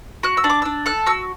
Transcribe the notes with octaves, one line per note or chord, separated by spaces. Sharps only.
F#4 F#6
E6
D4
D6
D4 E6
A4 F#6
F#4 E6